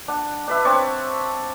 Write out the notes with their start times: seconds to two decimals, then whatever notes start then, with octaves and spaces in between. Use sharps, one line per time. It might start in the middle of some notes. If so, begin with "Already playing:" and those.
0.08 D4 F#5
0.47 D4 B4 E5
0.65 C4 D4 C#5 D5